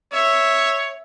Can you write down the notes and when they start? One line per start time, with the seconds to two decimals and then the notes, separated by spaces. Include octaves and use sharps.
0.13 C#5 E5